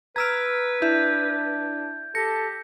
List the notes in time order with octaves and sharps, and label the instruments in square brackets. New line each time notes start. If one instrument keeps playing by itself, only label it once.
[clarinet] B4 [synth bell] A#5 E6 F6 [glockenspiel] G#6 D7
[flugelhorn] D4 [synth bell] E4 E5 [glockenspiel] G6
[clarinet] G4 [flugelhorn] A4 [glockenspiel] A#6 [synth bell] C#7